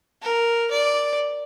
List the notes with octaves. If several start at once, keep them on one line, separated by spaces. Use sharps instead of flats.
A#4
D5